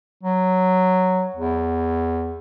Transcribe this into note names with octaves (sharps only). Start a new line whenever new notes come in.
F#3
E2